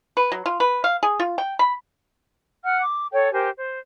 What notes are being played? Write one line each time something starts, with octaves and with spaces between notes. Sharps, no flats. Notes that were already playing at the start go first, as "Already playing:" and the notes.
B4
F#3
F4
B4
F5
G#4
F4
G5
B5
F#5 F6
D6
A4 C#5 G5
G4 A#4 C5 G#5
C5